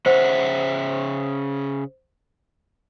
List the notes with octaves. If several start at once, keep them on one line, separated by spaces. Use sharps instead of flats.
C#3 C5 E5 F#5